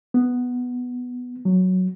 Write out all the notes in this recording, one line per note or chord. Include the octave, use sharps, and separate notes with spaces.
B3
F#3